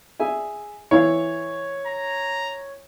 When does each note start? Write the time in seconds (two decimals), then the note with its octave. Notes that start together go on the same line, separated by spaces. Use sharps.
0.20 G#4 E5 G#5
0.91 E3 E4 C#5 F5
1.87 A#5